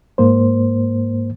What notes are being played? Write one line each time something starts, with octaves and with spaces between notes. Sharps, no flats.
G#2 A#3 C5